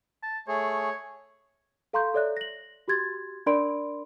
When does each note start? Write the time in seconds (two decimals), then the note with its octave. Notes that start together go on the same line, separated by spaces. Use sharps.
0.23 A5
0.48 A3 G#4 C#5
1.93 A4 F5 A#5 C6 C#6 G6
2.14 A4 C#5 D5 E5 F#6
2.37 A#6 F#7
2.88 F#4 G4 C6 G#6 A6
3.46 D4 A#4 D5 B5 C6 D7